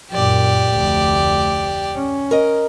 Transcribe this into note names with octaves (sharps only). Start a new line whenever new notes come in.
F#2 A#2 G4 D5
F1 D2
C#4
A#4 D#5